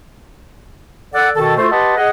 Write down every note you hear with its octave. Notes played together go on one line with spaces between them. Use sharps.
A4 D5 F#5
B2 D#3 A4
A3 F4 F#4 A4 C5
G4 B4 D#5 F#5 A5 C6
G#4 D#5 F#5